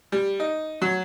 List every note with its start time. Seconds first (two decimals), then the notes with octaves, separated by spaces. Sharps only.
0.12 G3
0.40 D#4
0.82 F#3